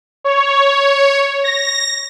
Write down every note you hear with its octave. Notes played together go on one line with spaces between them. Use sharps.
C#5
A#6